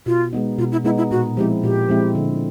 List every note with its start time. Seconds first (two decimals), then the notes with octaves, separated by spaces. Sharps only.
0.06 B2 F4
0.33 G#3 B3 D#4
0.58 B2 F4
0.72 E4
0.84 G#3 B3 D#4 E4
0.98 E4
1.11 A#2 F#4
1.37 F3 G#3 C4 E4 G4
1.63 A#2 G4
1.88 F3 G#3 C4 E4
2.15 D3